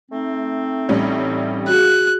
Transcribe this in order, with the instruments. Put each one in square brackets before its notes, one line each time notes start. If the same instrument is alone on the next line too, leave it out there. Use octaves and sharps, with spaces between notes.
[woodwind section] A3 C4 D#4
[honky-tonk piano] A1 G3 C#4
[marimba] F#4 G#4 [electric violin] F#6